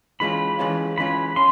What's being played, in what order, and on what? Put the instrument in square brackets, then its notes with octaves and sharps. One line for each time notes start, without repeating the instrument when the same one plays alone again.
[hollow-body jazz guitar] E3 G#3 C#4 F4 [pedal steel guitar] B5
[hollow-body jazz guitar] E3 G#3 C#4 F4
[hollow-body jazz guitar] E3 G#3 C#4 F4 [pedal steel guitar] B5
[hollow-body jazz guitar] C#4 [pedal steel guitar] C6